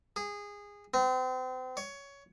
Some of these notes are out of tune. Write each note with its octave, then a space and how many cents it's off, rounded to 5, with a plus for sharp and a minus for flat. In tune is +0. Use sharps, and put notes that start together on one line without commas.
G#4 -20
C4 -35
C#5 +15